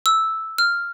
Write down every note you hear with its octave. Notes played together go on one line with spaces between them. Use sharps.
E6
F6